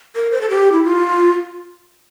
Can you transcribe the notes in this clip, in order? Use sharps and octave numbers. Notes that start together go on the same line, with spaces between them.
A#4
C5
A4
G4
E4
F4